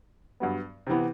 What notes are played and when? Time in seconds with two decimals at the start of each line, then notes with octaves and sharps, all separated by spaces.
0.40 G2 F#3 B3
0.87 C3 E3 B3